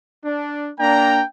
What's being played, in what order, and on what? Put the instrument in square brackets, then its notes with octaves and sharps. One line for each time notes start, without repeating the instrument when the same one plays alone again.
[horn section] D4
[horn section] A#3 D4 A#5 [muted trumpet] G5